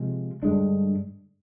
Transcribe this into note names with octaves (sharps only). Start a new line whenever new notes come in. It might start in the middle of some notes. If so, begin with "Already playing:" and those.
Already playing: C3 F3 G#3
G2 D3 G#3 D4